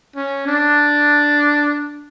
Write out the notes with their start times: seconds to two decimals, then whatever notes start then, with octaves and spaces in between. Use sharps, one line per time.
0.16 C#4
0.46 D4